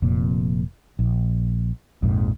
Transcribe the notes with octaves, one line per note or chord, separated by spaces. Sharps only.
F1 F2 A#2
A#1
A#1 F2 G#2